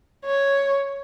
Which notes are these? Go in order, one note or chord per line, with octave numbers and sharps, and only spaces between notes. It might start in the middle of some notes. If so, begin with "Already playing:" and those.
C#5